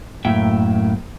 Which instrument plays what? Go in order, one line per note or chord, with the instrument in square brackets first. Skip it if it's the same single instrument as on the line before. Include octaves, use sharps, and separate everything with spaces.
[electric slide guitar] F#2 A2 A#3 E5 G5